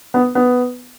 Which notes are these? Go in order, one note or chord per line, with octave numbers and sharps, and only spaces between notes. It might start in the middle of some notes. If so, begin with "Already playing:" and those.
B3
B3